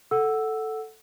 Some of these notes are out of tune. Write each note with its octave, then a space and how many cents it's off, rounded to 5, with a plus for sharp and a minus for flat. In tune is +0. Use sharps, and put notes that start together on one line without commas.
A4 +0 F#5 +0 E6 +0